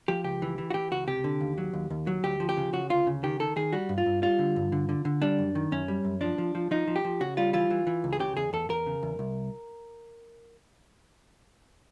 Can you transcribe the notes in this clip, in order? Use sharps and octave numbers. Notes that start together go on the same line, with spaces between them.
F3 G4
C#2 G4
E3
E3
F#4
E3 G4
C#2 F#4
C3 G4
D3
D#2
F#3
D#2
D#2
F#3
D2 G4
F3
G4
C#3
C#3 F#4
D2 F4
C#3
D#3 G4
D#3 A4
D#3 G#4
G3 F#4
G2
F4
G2
G3 F4
D3
G2
D3
D3
D3
G3 D4
F#2
D#3
F#2 C#4
G3
F#2
F3 D4
F3
F3
F3 D#4
F3
G4
F3
C#3 F#4
G3 F4
E3 F4
E3
E3
C#2
G#4
C#3 G4
E2 G#4
E2 A4
E2 A#4
C#3
E2
C2